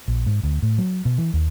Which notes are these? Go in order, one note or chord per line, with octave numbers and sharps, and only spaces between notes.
A#1
G#2
D2
A2
F#3
B2
E3
D#2